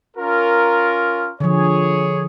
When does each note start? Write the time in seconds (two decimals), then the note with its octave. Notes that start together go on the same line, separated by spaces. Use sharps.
0.17 C#4 F4 A#4
1.40 D3 F3 G#4 C#5